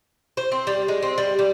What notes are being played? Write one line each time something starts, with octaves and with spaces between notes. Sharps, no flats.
C5
C4
G3
G#3
C4
G3
G3